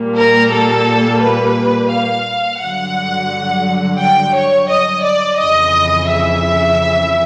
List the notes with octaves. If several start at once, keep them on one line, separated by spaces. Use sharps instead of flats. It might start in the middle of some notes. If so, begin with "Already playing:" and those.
Already playing: A#2 G3 A#3
A#4
A4
B4
F5
G2 D3 F#3 F#5
G5
C#5
D#5
D5
F2 C#3 E3 D#5
E5